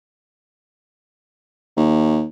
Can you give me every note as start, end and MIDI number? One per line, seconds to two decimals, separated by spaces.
1.77 2.24 39